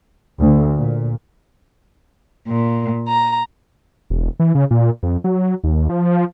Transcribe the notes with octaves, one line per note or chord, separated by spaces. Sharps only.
D2
A#2
A#2
A#5
E1
E3
C#3
A#2
F2
F#3
D#2
F3